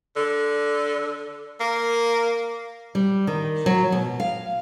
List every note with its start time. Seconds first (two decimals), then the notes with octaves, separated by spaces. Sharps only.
0.16 D3
1.60 A#3
2.95 G3
3.27 D#3
3.66 F#3
3.92 B2
4.20 F5